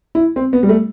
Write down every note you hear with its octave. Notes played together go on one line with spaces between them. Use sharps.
E4
C4
B3
G3
A3